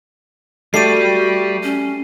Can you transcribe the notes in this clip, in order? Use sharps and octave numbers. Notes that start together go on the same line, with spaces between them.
G3 A3 F#4 G4 D5 C7 D#7
C#4